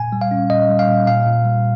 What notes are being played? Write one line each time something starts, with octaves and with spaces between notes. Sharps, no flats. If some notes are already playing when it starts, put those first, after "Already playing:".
Already playing: A#2 G#5
G3
F5
C#4
A#2 D#5
G3
F5
A#2
A#2 F5
A#2
G3